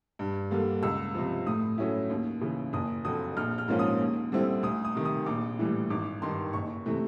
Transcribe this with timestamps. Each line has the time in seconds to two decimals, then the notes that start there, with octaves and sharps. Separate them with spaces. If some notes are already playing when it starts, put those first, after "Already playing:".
0.19 G2
0.51 D3 G3 A#3
0.83 C#2 E6
1.14 C3 F3
1.46 A2 D#6
1.78 F#3 A3 C#4 E4
2.10 D#2
2.41 C#3 E3
2.73 F#1 D#6
3.05 F2 D3 F#3 D#6
3.37 A#1 F6
3.58 F6
3.68 G#2 F3 A#3 C#4
3.79 D#6
4.00 D#2
4.32 D3 G3 C4 E4
4.63 D2 D#6
4.85 D#6
4.95 C3 D#3
5.05 D#6
5.26 A#1 D6
5.59 A2 E3 G3
5.90 G#1 D6
6.22 G2 D#3 C6
6.53 F#1 C#6
6.86 C3 E3 A3